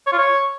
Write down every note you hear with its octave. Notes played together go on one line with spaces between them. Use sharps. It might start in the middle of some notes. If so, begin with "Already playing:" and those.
C#5
F4
C#5